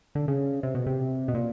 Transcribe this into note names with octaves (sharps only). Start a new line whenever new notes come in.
D3
C#3
C3
B2
C3
B2
A#2